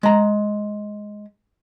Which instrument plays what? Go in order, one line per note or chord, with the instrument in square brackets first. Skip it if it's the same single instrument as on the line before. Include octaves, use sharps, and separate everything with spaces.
[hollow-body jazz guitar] G#3 A#5